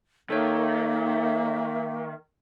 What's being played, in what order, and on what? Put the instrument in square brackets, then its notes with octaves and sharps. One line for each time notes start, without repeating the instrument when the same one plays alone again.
[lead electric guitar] D#3 [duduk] A#3 [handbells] A4 C#5 [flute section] E5